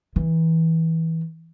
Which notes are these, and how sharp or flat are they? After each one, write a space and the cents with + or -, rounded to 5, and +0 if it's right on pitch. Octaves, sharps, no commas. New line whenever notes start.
E3 -25